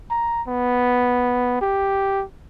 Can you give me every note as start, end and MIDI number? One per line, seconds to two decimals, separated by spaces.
0.10 0.42 82
0.47 1.59 59
1.61 2.24 67